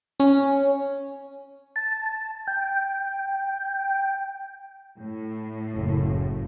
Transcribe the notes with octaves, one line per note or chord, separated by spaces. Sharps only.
C#4
A5
G5
A2
F#1